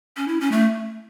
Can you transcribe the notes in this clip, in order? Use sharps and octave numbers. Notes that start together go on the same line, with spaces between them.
C#4
E4
C#4
A3